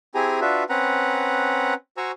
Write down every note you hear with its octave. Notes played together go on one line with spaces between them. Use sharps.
C4 E4 G4 G#4 G#5 A#5
D4 F4 F#4 B4 E5
C4 C#4 B4 F#5 A#5
F#4 C5 G#5 A#5 C#6 E6